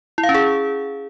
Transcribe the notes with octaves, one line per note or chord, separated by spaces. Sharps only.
E4
F5
C#4
G#4